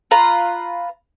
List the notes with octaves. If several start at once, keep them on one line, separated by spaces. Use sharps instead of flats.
F4 B4 A#5